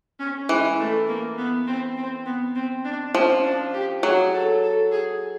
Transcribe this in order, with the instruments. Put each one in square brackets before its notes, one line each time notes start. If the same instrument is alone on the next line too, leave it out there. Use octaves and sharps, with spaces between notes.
[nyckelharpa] C#4
[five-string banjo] E3 [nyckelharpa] G#3
[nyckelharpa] A3
A#3
B3
C4
C4
B3
C4
D4
[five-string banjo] F3 [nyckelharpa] C#4
[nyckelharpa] D4
G4
[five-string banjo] F#3 [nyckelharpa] G#4
[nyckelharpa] A4
A4
G#4